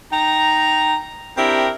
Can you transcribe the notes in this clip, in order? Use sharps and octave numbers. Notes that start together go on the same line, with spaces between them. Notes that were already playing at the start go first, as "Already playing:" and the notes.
D#4 G5 A#5
C4 D4 E4 G4 A#4